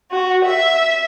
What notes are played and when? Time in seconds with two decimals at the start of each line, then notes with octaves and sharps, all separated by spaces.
0.10 F#4
0.44 E5